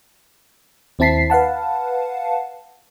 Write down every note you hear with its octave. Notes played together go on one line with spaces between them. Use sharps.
D#2 C4 E4 A5 B6 C7
B4 F5 F#5 A5